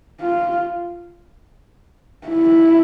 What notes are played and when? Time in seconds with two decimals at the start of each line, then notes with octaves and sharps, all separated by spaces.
0.21 F4
2.28 E4